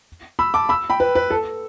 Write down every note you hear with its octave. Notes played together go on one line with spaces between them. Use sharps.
B5 E6
A5 D6
B5 E6
G5 B5
B4
B4
A4